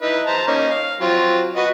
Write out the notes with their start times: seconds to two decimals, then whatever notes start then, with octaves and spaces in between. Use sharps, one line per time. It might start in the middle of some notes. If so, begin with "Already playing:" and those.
0.02 D#4 E4 B4
0.26 C5 A5 A#5
0.47 A#3 C#4 D#4
0.70 F5
1.00 F#3 C4 F4
1.56 F#4 B4 D#5